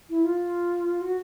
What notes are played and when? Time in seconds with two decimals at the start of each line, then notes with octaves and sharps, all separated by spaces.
0.09 E4
0.24 F4
1.01 F#4